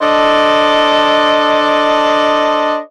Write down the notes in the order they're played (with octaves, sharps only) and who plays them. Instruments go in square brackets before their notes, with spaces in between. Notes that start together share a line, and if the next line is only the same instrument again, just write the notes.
[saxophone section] D4 A4 C5 D#5